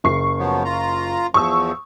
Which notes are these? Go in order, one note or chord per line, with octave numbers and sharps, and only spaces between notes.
F#1 C#6 C7
F3 F#3 B3
F4 A#5
E2 F3 C#6 D#6 E6